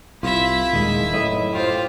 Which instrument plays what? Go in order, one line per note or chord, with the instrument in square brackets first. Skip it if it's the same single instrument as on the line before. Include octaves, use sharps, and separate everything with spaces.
[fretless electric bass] C2 [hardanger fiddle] E4 E5 [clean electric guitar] F4
[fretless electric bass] D#1 [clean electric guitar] D#3 G#3
[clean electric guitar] F#2 B4 D#5 [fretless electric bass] A2
[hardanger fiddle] F4 C5 [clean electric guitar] G4